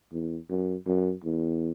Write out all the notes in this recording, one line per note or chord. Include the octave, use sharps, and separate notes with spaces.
E2
F#2
F#2
E2